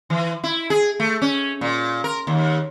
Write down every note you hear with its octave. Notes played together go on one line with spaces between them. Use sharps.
E3
E4
G#4
A3
C#4
A#2
A#4
D#2